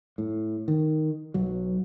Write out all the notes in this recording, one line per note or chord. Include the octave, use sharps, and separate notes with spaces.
A2
D#3
B1 F#3